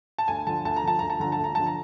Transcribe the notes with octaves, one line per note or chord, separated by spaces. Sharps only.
A5
D2 G#5
D3 F3 A5
D2 A5
A#5
D3 F3 A5
D2 A#5
A5
D3 F3 A#5
A5
D2
A#5
D3 F3 A5
A#5